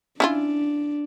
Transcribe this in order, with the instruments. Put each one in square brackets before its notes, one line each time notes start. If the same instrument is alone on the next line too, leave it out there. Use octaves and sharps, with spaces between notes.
[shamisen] C#4 E4 F4 [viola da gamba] D4